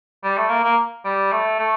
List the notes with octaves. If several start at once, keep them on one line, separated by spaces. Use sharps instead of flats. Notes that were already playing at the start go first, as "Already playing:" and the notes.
G3
A3
A#3
A#3
G3
A3
A3